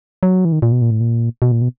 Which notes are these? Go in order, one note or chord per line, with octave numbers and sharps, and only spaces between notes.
F#3
E3
D#3
A#2
B2
A#2
A2
A#2
B2
A#2
B2